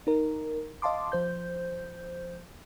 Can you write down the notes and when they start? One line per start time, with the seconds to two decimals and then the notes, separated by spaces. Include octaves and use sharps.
0.07 D#4 A#4
0.82 D#5 F5 A5 C6 D6
1.12 F3 C5 G6